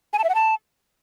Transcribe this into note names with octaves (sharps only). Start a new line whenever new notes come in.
G#5
A5
E5
F#5
A5